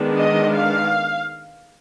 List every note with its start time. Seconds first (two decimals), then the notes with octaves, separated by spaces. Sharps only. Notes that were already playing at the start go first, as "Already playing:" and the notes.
Already playing: D#3 G#3 B3 D4
0.17 D#5
0.55 F5